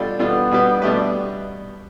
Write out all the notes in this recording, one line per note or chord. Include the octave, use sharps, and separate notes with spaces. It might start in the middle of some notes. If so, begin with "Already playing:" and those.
Already playing: B2 G3 D4 F4 A4
B2 G3 B3 D4 F4 A4
B2 G3 D4 G4 B4
B2 G3 A3 D4 G4 B4